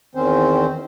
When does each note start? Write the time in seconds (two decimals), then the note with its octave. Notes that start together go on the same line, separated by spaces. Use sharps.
0.15 E2 D#3 C4 C#4 C5